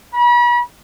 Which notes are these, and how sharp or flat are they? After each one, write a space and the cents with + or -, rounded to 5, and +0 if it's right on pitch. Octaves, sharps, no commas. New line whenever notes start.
B5 -40